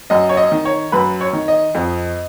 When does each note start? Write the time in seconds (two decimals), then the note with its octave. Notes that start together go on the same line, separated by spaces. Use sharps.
0.10 F#2 D#5
0.29 C#5
0.37 D#5
0.52 D#3
0.65 C#5
0.92 F#2 B4
1.21 C#5
1.33 D#3
1.48 D#5
1.75 F2